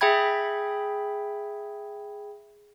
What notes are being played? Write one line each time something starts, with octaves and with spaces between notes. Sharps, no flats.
G#4 E5 G5 B5 G#6